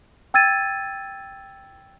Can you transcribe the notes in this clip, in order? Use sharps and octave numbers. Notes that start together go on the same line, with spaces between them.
G5 E6 G#6 A6 D#7